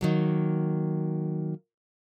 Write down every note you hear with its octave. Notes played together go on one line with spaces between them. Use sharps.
D#3 F#3 A#3